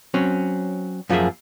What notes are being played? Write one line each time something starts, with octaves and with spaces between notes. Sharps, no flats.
F#3 C4 C#4
F#2 F3 A#3 F#4 G#4 E5